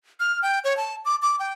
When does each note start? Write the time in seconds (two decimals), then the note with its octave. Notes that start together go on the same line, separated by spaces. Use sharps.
0.20 F6
0.42 G5
0.64 C#5
0.77 A5
1.05 D6
1.22 D6
1.39 G5